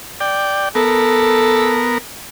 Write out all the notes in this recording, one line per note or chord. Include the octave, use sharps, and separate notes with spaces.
D5 G5
B3 A4 A#4